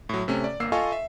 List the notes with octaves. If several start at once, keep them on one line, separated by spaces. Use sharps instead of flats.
A2 F#3
C3 A3 C#4
D5
G1 A#3 E6 C7
F4 A4 D#5 F5 G#5 C#6
E5